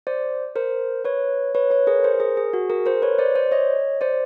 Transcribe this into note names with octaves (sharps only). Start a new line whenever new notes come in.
C5 D5
A#4 C5
B4 C#5
B4 C#5
B4 C#5
G#4 A#4
A#4 C5
G#4 A#4
G#4
F#4
G#4 A#4
A#4 C5
B4 C#5
C5 D5
C5 D5
C#5 D#5
C5 D5